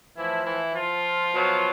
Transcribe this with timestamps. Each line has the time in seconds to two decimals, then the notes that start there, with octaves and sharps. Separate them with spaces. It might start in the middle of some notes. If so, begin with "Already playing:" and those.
0.16 A2 E3 F3 E4
0.45 E3 E4
0.74 F3 F4
1.32 B2 F#3